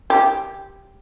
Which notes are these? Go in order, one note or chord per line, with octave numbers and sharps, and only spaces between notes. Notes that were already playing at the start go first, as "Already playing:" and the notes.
G4